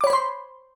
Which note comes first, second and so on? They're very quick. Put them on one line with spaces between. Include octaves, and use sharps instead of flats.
D6 C#5 B5 C5 C6